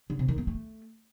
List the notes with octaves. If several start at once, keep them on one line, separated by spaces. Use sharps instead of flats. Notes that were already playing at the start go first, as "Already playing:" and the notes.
D3
C3
D#3
A#3
A3